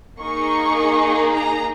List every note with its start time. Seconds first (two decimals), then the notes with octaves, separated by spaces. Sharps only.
0.20 A#3 D#4 G#4 C#6
1.32 A#5